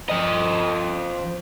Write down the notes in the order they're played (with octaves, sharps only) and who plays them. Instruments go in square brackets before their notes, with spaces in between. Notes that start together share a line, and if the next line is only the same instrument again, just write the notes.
[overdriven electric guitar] F3 D#5